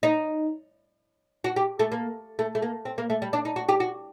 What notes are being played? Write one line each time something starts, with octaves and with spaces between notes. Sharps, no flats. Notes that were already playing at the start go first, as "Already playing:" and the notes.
D#4
F#4
G4
A3
A#3
A3
A3
A#3
C4
A#3
A3
G3
D4
D#4
F#4
G4
F#4